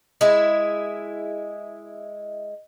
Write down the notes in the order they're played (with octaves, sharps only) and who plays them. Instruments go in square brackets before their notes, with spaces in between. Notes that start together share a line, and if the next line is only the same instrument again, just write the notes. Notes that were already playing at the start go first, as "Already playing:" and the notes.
[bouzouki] G#3 E4